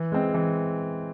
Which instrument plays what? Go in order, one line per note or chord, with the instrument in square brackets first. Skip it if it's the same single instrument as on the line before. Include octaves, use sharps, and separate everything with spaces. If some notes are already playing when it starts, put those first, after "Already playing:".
Already playing: [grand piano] E3
G#3 C4
E3